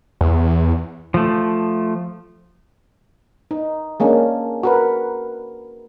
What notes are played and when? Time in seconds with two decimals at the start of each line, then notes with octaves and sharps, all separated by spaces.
0.21 E2
1.14 F3 A3
3.51 D#4
4.00 G#3 A#3 C#4 D4
4.63 F#4 A#4 B4